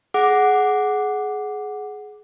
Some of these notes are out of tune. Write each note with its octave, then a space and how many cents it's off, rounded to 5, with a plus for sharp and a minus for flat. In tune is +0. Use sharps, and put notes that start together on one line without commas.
G#4 +20 F#5 +0 D6 +0